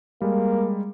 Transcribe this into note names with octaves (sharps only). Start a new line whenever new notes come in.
G3 G#3 A#3